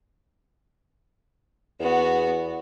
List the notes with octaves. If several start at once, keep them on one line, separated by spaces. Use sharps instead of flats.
E2 B3 F#4